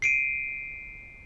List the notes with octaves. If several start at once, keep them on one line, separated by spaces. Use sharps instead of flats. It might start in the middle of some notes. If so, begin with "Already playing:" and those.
C7 D7 D#7